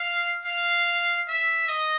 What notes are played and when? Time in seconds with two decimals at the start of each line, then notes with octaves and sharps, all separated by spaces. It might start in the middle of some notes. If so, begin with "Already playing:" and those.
Already playing: F5
0.45 F5
1.28 E5
1.68 D#5